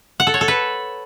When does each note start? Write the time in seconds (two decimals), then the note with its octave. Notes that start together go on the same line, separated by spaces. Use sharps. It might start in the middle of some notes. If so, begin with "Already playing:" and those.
0.20 F#5
0.27 A4
0.34 C#5
0.41 A4
0.48 B4